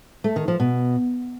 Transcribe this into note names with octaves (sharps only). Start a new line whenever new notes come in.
A3
D#3
F3
B2